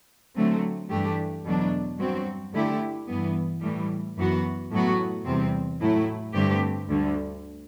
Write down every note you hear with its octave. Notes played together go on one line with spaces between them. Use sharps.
D3 F#3 A3 C4
G2 E3 A3 D4 G4
E2 B2 F#3 A3 D4
G2 F#3 C4 F#4
D3 A3 E4 G4
G2 E3 B3
A2 E3 G3
F#2 E3 B3 F#4
A2 F#3 B3 F#4
E2 C3 G3 C4
A2 F#3 A3 E4
G2 D3 A3 C4 G4
D2 D3 G3